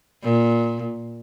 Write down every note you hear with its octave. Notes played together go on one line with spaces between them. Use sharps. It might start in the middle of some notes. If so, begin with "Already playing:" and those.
A#2